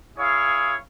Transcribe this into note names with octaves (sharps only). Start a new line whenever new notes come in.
E4 G#4 C#5 F5